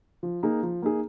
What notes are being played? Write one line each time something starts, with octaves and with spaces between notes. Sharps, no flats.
F3
A#3 D#4 G#4
F3
A#3 D#4 G#4